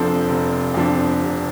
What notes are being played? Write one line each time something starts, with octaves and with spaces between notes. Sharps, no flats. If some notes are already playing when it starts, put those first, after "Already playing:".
Already playing: F1 F2 F3 D4 A4 C5
F1
F2 F3 D4
F1